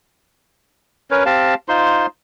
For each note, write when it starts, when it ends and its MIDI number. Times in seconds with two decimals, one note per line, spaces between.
1.11 1.24 61
1.11 1.24 70
1.11 1.24 71
1.11 1.24 73
1.26 1.54 60
1.26 1.54 67
1.26 1.54 77
1.26 1.54 81
1.68 2.06 63
1.68 2.06 65
1.68 2.06 72
1.68 2.06 84